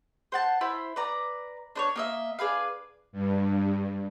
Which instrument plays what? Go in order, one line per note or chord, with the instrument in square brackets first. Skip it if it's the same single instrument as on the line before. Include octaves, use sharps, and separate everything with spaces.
[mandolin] C5 F#5 A5
E4 C5 B5
B4 D5 A#5
D4 C5 C#5
A#3 D#5 E5
D4 G#4 B4 F5
[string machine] G2